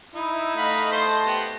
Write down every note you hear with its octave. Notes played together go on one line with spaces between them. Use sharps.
D#4 E4
A3 D#5 F5 F#5 B5
C5 A5 C6
B3 G4